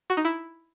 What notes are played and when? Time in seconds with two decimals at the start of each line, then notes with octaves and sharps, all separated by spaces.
0.10 F#4
0.17 D#4
0.25 E4